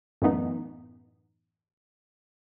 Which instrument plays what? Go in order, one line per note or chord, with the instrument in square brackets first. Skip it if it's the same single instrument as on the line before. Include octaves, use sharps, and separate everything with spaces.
[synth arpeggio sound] F#2 A2 E3 B3 D#4